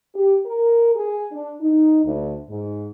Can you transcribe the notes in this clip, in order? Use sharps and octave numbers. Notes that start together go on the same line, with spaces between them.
G4
A#4
G#4
D4
D#4
D2
G#2